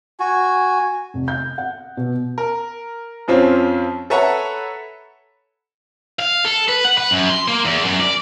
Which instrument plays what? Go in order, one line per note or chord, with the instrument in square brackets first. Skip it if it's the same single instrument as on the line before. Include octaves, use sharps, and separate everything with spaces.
[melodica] F#4 [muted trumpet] G#5
[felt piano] F1
G6
F#5
B2
[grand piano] A#4
F2 F3 C4 C#4
A4 B4 C#5 E5 F#5 A#5
[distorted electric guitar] F5
A4
B4
F#5
B4
F#2
C6
A#3
E2
F#2
D5